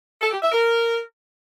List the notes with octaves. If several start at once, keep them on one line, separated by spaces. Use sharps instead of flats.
A4
G4
E5
A#4